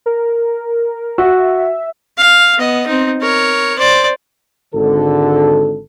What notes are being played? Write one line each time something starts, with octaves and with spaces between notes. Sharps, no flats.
A#4
F#4 E5
F5
B3 D#5
C4 D#4
A#4 C#5
C5 D5
G#1 D3 A4